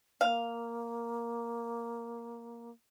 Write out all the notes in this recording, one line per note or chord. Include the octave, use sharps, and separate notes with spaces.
A#3 F5